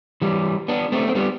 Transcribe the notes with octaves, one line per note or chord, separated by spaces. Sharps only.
E3 G3
B3 D4
A3 C4
C4
G3 B3